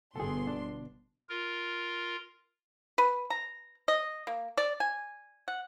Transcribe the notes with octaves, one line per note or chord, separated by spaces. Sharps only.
G1 B2 G#4 A4 C6
D4
F4 A#4
B4
A#5
D#5
A#3
D5
G#5
F#5